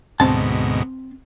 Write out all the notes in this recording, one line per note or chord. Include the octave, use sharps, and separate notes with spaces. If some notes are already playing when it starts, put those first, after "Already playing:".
D2 G#2 B2 C4 A5